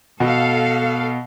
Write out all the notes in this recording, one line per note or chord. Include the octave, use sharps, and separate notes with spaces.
B2 A4 F5